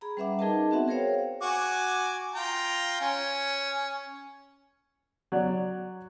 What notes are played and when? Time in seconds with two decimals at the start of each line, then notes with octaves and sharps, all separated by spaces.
0.01 G#4 A#5 B5
0.17 G3 C#4 B4 E5 F#5 D6
0.39 D#4 G#4 A#4 B4 D#5 A5
0.71 B3 C4 F#4 B4 E5 F#5
0.88 G#4 A#4 C5 C#5 F5 G5
1.41 F#4 G#5 D6
2.33 F4 G5 A#5
3.00 C#4 G#5
5.32 F#3 D5